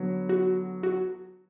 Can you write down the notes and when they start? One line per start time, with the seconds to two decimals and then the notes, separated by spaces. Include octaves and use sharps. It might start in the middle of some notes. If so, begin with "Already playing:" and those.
Already playing: D3 F#3 B3
0.29 F#4
0.83 F#4